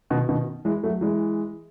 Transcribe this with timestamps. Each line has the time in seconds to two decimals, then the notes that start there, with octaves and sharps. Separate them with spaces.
0.10 B2 D#3
0.29 B2 D#3
0.65 E3 G#3
0.83 F#3 A3
1.01 E3 G#3